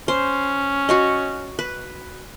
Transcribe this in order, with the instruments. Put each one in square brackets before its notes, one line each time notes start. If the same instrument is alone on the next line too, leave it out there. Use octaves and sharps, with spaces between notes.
[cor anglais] C#4 [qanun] C5
[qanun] F#4 C#5 D#5
B4